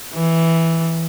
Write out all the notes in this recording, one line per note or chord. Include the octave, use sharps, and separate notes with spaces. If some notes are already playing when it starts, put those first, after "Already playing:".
E3